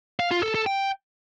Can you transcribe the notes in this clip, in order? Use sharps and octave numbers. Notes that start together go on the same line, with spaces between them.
F5
F4
A4
A4
G5